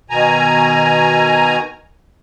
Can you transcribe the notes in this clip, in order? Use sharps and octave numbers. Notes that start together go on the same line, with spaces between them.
B2 D#3 G#5 A#5